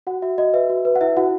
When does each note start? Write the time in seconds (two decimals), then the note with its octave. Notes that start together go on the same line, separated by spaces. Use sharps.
0.07 F#4 F#5
0.22 F#4 E5
0.38 F#4 D#5
0.54 B4 E5
0.70 F#4
0.85 B4
0.95 F#5
1.01 E4 E5
1.17 E4 F#4 F#5